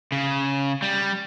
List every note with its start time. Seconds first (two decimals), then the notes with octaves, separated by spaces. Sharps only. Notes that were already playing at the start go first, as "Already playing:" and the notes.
0.12 C#3
0.82 G3